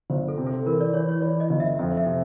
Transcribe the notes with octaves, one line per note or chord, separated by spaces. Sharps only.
G1 C5
A4
C3
A4
E3 A#4
D5
E3 C#5
C#5
E3 D5
D#5
G1
E5
F2 E5
E5
C3